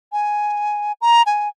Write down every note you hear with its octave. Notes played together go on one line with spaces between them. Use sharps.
G#5
A#5
G#5